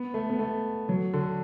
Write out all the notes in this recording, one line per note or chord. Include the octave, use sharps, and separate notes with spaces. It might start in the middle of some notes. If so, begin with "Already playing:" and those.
Already playing: B3
A3
B3
A3
F#3
D3